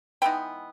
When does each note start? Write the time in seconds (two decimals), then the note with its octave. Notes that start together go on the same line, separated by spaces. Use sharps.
0.22 E3 G#3 B3 D#4 G5